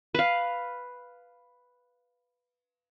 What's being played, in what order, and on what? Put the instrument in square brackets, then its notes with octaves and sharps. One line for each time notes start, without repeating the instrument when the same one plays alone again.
[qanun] B4 F5